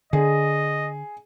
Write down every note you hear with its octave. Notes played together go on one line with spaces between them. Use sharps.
D3 G#4 D#5